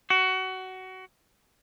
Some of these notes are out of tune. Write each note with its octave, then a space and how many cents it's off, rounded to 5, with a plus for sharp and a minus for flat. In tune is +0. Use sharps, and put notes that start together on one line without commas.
F#4 +20